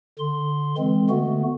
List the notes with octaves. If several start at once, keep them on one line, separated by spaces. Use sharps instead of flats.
D3 C6
E3 G#3 C4
D3 A3 B3 F#4